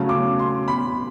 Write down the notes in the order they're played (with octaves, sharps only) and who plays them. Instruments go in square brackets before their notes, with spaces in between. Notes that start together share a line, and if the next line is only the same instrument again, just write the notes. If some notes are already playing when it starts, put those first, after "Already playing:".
Already playing: [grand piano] C#3 F#3 A3 C#4
[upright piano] D6
C6
B5